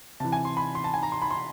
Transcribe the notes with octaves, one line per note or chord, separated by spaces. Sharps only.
C3 E3 A5
G#5
C6
B5
C6
A5
G#5
A#5
C6
B5
C6